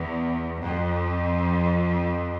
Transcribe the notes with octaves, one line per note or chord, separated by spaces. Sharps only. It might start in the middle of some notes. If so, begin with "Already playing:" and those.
Already playing: E2
F2